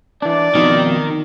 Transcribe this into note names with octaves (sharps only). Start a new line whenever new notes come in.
E3 D4 D5
F2 B2 D#3